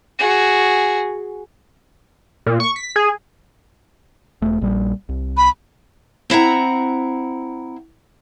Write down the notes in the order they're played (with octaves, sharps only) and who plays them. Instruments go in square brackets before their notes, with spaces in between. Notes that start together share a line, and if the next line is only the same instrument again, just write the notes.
[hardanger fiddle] F#4 G#4
[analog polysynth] A#2
C#6
B6
G#4
[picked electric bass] E1 A3
A#1 G3
C2
[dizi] B5
[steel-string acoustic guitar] C4 E4 F#5 A#5